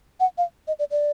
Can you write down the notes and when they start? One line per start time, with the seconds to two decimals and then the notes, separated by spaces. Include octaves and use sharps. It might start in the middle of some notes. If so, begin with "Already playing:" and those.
0.20 F#5
0.38 F5
0.67 D#5
0.79 D5
0.91 D5